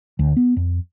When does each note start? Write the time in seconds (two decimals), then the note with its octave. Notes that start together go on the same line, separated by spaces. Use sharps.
0.19 D2
0.37 B3
0.57 F2